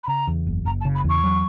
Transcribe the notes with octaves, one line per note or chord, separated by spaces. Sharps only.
B5
C#3 A#5
E2
F#1
F#1 A#5
A5
C#3
B5
E2 C#6
F#3